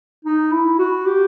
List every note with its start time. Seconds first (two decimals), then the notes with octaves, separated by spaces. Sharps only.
0.25 D#4
0.52 E4
0.79 F#4
1.06 G4